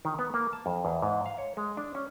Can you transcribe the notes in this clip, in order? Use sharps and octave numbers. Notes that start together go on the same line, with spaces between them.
D#3
B3
A#3
A5
F2
E2
G#2
F5
C#5
G#3
D4
C#4